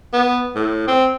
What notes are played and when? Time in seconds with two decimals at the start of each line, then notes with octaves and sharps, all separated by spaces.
0.13 B3
0.55 A2
0.87 C4